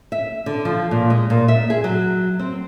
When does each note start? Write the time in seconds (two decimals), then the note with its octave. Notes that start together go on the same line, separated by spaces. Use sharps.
0.12 E5
0.46 D3
0.65 F3
0.91 A#2
1.10 G#3
1.30 A#2
1.48 E5
1.70 G#4
1.84 F#3
2.39 C4